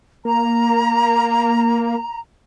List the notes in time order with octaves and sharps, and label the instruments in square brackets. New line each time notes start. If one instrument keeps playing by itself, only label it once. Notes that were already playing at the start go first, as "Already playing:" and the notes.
[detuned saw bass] A#3 [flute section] A#5